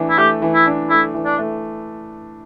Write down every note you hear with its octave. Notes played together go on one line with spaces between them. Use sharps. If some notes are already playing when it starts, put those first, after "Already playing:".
Already playing: E3 A3 D4
E4
A3 G4
E3
E4
D4
A3 E4
E3
D4
A3